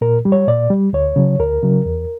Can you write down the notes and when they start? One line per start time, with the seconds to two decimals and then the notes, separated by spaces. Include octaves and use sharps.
0.01 A#2 A#4
0.25 G3
0.32 C#5
0.48 A#2 D5
0.70 G3
0.93 D2 C#5
1.16 C#3 F#3
1.39 D2 A#4
1.63 C#3 F#3
1.85 E2